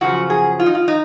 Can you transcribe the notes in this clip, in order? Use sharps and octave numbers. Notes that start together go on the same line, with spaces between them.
F#2 C#3 F3 F#4
G#4
F4
D#4
F4
D#4